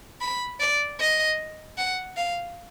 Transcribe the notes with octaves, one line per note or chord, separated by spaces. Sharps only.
B5
D5
D#5
F#5
F5